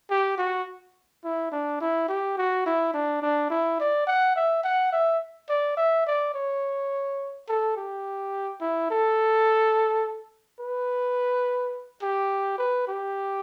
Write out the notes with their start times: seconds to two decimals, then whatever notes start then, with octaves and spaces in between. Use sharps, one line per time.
0.10 G4
0.38 F#4
1.24 E4
1.52 D4
1.81 E4
2.08 G4
2.38 F#4
2.66 E4
2.94 D4
3.22 D4
3.50 E4
3.80 D5
4.07 F#5
4.36 E5
4.64 F#5
4.93 E5
5.49 D5
5.77 E5
6.07 D5
6.34 C#5
7.49 A4
7.76 G4
8.61 E4
8.90 A4
10.60 B4
12.02 G4
12.58 B4
12.88 G4